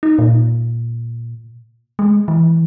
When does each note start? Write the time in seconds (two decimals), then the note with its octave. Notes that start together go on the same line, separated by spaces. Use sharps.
0.03 D#4
0.19 A#2
1.99 G#3
2.28 E3